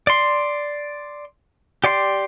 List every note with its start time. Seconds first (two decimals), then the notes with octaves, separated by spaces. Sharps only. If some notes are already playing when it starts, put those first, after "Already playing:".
0.07 D5 C6
1.84 G4 D5 G5 C6